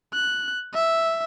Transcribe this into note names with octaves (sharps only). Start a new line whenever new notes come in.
F#6
E5